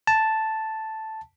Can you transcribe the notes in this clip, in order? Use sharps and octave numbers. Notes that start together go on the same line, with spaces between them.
A5